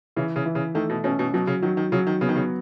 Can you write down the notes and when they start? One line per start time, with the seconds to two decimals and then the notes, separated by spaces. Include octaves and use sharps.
0.16 C#3 E3
0.36 C#3
0.46 E3
0.55 C#3
0.75 D#3 A3
0.90 B2
1.04 B2 C#4
1.19 B2
1.33 B2 F#3
1.47 C#3
1.63 D#3 F#3
1.77 D#3
1.92 C#3 F#3
2.07 D#3
2.21 C#3 B3
2.29 D#3
2.36 C#3